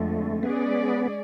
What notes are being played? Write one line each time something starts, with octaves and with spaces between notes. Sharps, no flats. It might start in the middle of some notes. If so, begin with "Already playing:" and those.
Already playing: F2 D3 G#3 A3
G#3 B3 C#4 G#4 D5